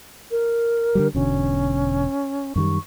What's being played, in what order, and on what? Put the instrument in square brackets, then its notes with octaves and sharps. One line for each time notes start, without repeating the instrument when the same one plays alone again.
[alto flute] A#4
[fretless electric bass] D3 F3 G3
[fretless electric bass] E1 B2 D3 [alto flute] C#4
[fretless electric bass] F#2 D#3 G3 [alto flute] C#6